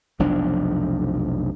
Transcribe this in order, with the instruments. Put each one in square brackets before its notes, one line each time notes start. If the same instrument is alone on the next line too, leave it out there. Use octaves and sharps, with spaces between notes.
[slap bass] F1 B1 F3 D4